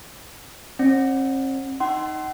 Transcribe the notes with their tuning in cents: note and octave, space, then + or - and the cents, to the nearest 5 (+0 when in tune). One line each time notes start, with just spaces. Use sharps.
C4 +45 D5 +15
D#4 +0 F#5 +35 C6 +0